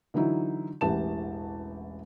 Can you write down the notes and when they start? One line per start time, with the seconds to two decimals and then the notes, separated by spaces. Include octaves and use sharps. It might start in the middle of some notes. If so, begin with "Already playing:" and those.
0.14 D3 E3 F#3 D#4 E4
0.81 E1 A1 E3 G4 A5 E7